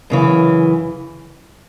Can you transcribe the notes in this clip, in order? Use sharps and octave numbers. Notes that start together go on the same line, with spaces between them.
F#2 C#3 E3